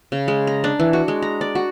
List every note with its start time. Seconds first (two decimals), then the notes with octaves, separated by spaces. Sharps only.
0.12 C#3
0.28 G#3
0.47 A#5
0.64 D4
0.80 E3
0.93 F#4
1.08 G#3
1.22 A#5
1.41 D5
1.55 F#4